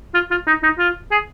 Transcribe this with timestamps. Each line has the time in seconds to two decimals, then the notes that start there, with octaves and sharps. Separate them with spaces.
0.14 F4
0.31 F4
0.47 D#4
0.63 D#4
0.79 F4
1.11 G#4